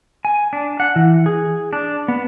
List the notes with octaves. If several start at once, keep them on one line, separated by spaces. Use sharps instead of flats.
G#5
D4
F#5
E3
G#4
D4
B3